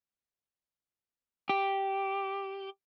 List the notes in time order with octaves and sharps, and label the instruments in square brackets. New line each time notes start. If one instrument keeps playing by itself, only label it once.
[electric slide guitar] G4